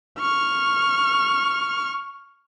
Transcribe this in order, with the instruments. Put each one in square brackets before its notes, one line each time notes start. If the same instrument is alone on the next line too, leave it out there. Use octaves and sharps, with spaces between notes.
[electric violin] C#6 F6